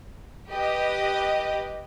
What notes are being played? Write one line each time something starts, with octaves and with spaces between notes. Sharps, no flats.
G4 B4 D#5